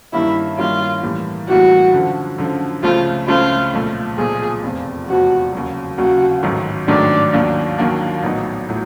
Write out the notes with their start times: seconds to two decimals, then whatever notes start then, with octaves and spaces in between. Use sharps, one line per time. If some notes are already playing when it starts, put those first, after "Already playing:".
0.13 G2 D#3 G3 A#3 C#4 E4
0.58 G2 D#3 G3 A#3 C#4 F4
1.03 A2 E3 G3 A#3
1.48 A2 E3 G3 A#3 F#4
1.93 F#2 D3 F3
2.38 F#2 D3 F3
2.83 C#2 C#3 F3 A3 C4 F4
3.28 C#2 C#3 F3 A3 C4 F4
3.73 B1 A#2 F3 A3
4.18 B1 A#2 F3 A3 G#4
4.62 F1 E2 C3 F3
5.08 F1 E2 C3 F3 F#4
5.53 D#2 C#3 F#3
5.98 D#2 C#3 F#3 F#4
6.43 A1 G#2 D#3 F#3 A3
6.88 A1 G#2 D#3 F#3 A3 D4
7.33 D#2 D#3 F#3 A#3 D4
7.78 D#2 D#3 F#3 A#3 D4
8.23 A#1 A2 F#3 B3 D#4
8.69 A2 F#3